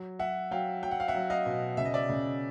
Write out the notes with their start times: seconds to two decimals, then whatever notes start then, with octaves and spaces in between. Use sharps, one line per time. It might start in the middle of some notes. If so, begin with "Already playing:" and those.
Already playing: F#3
0.19 F#3 E5 F#5
0.51 F#3 F5 G5
0.83 F#3 G5
0.91 F#5
1.00 F5
1.08 E5 F#5
1.15 F#3
1.30 D#5 F5
1.46 B2
1.77 C#3 E5
1.86 D#5
1.94 D5 E5
2.09 C#3